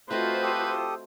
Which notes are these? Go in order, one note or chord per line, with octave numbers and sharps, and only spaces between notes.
A3 C4 F4 F#4 B4 C5 D#5
G4 A4 D#6